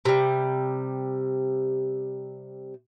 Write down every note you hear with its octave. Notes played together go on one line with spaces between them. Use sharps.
C3 G3